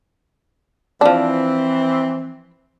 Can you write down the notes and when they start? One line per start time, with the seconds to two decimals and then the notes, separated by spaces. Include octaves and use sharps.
1.01 E3 F3 C4 D4